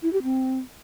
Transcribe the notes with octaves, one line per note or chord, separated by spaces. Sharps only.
E4
G4
C4